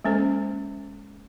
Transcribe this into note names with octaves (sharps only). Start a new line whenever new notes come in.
G#3 A#3 C#4 A4 C5